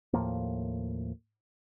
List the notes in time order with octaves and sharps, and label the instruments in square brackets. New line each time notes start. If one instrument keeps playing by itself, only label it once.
[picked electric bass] D#2 A2 F3 A#3